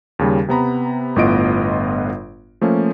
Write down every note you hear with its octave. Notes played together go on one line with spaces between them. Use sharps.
D#2 C#3 G3
C3 B3 A#5 B5
G1 A2 B3 F4 D#5 D7
F3 A3 A#3 C#4